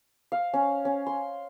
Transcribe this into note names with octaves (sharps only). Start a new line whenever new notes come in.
F5
C#4
C#4
C6